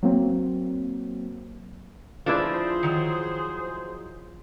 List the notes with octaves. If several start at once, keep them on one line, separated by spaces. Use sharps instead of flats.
F#3 A#3 C4
F3 D4 E4 G#4 B4 C5 D5
D#3 F#3